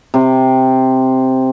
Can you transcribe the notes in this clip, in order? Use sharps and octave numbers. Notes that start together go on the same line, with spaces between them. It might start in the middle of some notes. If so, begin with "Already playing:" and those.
C3